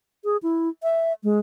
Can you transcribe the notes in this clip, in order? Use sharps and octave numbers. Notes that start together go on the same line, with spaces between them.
G#4
E4
E5
G#3